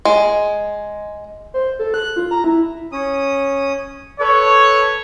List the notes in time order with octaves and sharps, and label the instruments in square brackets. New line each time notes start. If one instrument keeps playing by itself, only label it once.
[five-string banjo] G#3
[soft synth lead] C5
A4
F#6
F4
A#5
E4
[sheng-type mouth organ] C#4 D#6
[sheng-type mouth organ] A4 B4 [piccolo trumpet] C#5